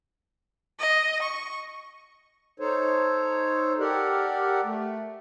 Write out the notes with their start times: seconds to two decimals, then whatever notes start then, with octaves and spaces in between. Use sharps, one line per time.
0.80 D#5
1.23 C#6
2.60 D#4 A4 C5 C#5
3.80 G4 A4 A#4 D5 F#5
4.64 A3